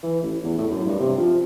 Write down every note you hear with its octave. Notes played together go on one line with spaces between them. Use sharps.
E3
A1
E2
A2
F#2
G2
C3
F3